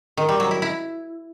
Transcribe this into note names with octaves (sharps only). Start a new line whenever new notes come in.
D#3
G3
F#3
E4
E4